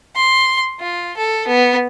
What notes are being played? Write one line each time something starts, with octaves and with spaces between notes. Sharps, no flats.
C6
F4
A4
B3